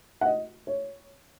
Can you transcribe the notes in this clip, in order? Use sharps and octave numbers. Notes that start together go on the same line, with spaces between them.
F#5
D#5
C#5